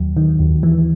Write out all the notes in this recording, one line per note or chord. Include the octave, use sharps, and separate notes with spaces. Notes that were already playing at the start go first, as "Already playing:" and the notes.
Already playing: D#2 F#3
D#3
D#2
E3